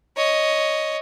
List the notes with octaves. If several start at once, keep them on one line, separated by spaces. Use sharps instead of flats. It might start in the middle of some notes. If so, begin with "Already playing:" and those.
C#5 D#5